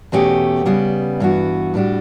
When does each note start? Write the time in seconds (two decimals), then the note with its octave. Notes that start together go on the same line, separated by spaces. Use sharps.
0.12 E2 B2 A3 C#4 G4
0.66 C#3 G3 B3
1.20 G2 E3 B3 F#4
1.74 A2 G3 D4 F#4